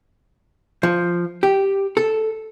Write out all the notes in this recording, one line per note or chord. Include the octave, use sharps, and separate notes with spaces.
F3
G4
A4